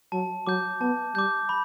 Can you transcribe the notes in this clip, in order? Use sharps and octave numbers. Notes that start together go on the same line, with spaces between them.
F#3 A5
F#3 D6 G6
B3 A5
G3 D6 G6
B5